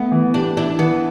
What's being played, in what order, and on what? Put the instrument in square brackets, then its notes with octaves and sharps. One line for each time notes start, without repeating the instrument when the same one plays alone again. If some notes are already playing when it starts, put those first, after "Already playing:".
Already playing: [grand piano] A3 [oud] B3
[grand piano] E3
[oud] D4 [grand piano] G4
[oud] D4 [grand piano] E4
[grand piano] E3 [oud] B3